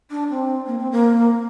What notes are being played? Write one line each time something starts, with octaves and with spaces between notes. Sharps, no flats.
D4
C4
A#3
C4
A#3